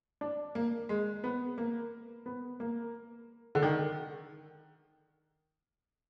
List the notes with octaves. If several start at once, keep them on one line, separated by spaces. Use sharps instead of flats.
D4
A#3
G#3
B3
A#3
B3
A#3
D3
D#3